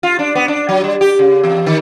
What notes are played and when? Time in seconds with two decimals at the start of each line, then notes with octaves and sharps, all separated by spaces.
0.03 F4
0.19 D4
0.35 B3
0.48 D4
0.69 F#3
0.84 G3
1.01 G4
1.19 C#3
1.44 E2
1.66 D#3